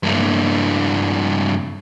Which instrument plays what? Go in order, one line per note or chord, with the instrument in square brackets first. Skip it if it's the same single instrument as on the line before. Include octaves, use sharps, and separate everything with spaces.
[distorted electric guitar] G2 A#3